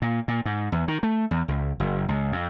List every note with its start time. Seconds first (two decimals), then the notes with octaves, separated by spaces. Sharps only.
0.02 A#2
0.28 A#2
0.45 G#2
0.72 E2
0.88 D#3
1.03 A3
1.31 E2
1.48 C#2
1.80 F#1
2.08 C#2
2.32 F2